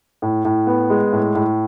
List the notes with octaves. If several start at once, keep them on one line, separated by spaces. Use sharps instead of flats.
A2
A2
B3
G#3
A2
A2